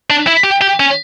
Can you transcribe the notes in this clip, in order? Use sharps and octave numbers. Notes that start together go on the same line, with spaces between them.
D4
E4
G4
G4
C#4